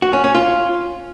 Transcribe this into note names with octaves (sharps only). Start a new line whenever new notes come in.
F#4
C#4
C#4
F4